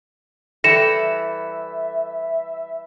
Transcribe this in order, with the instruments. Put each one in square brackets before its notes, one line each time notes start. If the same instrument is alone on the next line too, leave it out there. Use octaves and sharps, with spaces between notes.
[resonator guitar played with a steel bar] E3 G3 A4 [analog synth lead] E5 [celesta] A#6 C#7 E7